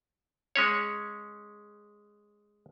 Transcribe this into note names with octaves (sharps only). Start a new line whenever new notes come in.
G#3 C#4 C#5